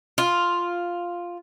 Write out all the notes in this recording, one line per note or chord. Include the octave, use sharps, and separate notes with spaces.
F4